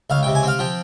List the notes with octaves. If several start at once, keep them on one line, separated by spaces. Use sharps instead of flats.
C#2 F5
C3 G5
G#5
C4 F5
F3 G5